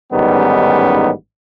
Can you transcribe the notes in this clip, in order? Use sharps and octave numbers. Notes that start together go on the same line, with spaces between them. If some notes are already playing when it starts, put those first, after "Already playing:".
A1 G#2 D#3 G3 B3 C#4